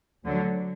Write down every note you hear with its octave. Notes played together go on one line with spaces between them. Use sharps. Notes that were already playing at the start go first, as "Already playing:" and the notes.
D2 D3 F#3